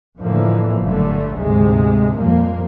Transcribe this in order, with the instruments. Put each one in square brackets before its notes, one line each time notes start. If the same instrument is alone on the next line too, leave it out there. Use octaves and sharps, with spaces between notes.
[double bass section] F2 A2 D3 E3 F3 A#3
G1 G2 A#2 D3 F#3 A3
D2 G#2 C3 G#3
F2 A#2 F3 G3 A#3